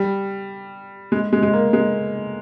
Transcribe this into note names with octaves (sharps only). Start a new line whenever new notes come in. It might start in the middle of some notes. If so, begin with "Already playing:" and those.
Already playing: G3
G#3
G#3
G#3
A#3
G#3